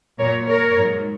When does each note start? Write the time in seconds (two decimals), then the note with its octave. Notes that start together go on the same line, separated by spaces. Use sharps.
0.19 A#2 F#3 A#4 C#5
0.47 A#4 C#5
0.77 G#2 F#3